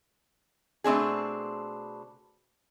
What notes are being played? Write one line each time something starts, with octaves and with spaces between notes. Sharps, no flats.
B2 A3 C4 D4 G#4